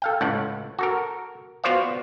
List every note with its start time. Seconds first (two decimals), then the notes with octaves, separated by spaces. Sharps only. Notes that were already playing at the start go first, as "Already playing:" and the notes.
0.02 A4 F5 G5
0.21 C#2 A2 F#5
0.79 F#4 A4 A#4
1.64 B3 F4 F#4 C5 D5 F5